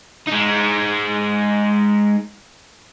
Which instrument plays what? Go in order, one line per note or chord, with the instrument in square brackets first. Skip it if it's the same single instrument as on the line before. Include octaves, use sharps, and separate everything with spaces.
[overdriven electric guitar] G#3 D#4